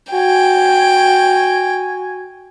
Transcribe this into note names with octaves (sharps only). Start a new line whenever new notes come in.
F#4 G5 G#5